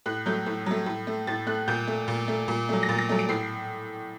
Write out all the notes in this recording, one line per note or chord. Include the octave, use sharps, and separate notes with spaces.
A2 F#6
F#3 A3 G6
A2
F#3 A3
A2
A3
A2 A6
A3 F#6
A#2 G6
A3
A#2
A3
A#2
F#3 A3
A#6
A#2 A6
A#6
F#3 A3
D7
A2 C7